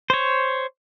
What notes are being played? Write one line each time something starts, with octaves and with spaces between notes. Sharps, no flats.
C5 C#5